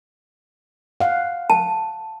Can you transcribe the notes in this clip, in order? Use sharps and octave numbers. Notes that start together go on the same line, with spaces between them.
F5 F#5
A5